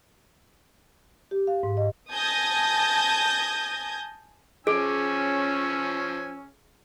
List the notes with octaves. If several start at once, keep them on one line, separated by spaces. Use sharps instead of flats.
G4
F5
G#2
D#5
G#5 A5 D#6 G6 G#6 A#6
F3 C#4 G#4 G#5 E6